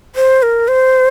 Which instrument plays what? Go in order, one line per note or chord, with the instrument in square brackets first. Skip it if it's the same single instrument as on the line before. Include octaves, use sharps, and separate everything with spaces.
[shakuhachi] C5
A#4
C5